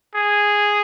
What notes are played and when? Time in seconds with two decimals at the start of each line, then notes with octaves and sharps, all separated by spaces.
0.15 G#4